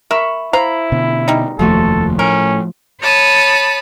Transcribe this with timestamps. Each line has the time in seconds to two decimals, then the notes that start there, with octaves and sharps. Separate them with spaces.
0.11 A#4 E5 B5 C#6
0.53 E4 C5 F5 A#5 B5
0.92 B2 D3
1.28 G3 D#4
1.59 F1 D#2 F3 A3 F#4 A4
2.19 A2 C#4 A#4
3.00 C#5 A5 B5 D#6